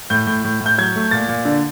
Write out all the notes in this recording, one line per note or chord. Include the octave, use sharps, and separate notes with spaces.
A2 G6
A2
A2
A2
G6
F#3 G#6
A3
A#2 A6
A#2
D3